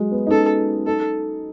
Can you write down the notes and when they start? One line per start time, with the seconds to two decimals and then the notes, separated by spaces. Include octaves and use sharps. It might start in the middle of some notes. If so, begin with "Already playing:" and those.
Already playing: F#3 G#3
0.12 B3
0.27 D#4
0.31 C#4 A4
0.87 D#4 A4